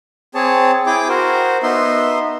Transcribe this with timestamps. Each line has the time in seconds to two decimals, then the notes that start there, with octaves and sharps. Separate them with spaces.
0.35 C4 G#4 C#5 A5
0.86 E4 G#4 G5 D6
1.09 F#4 A#4 C5
1.63 B3 D#4 E5 C6